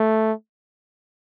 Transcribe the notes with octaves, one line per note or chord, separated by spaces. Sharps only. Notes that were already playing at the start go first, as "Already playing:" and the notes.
Already playing: A3